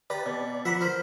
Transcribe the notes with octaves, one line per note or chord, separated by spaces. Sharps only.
G4 B4 D5 A#5
B2 D5
F3 E5 F#5 A#5 B5
A#4 C5